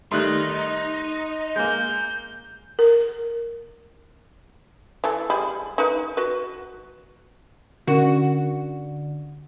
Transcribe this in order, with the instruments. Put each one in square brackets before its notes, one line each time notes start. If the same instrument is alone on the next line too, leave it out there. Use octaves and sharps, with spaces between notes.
[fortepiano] D#3 G3 A3 [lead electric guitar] D#4 [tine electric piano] C6 F#6
[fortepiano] G#3 A#3 [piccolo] G6
[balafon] A#4
[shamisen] E3 A4
G3 G#3 B5
D#4 B4
F#4 B4
[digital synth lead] D3 [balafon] C#4 A#4 [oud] F#4